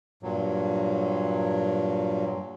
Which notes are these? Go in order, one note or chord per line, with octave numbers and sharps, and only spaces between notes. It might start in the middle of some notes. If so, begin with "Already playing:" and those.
G2 A#2 F#3